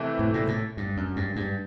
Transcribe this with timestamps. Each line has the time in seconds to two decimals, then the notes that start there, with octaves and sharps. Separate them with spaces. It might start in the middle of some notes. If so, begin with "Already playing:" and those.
Already playing: C3 E3 A3
0.19 A2
0.34 A#2
0.48 A2
0.77 G2
0.97 F#2
1.16 G2
1.36 G2